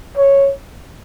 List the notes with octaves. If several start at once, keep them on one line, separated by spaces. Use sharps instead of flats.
C#5